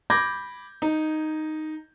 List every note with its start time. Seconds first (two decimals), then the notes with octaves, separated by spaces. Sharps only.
0.10 B5 D6 G6 G#6 A#6
0.82 D#4